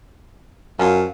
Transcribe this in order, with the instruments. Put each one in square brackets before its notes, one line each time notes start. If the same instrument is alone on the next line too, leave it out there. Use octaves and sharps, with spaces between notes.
[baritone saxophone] F#2 [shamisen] F3 C#4 F4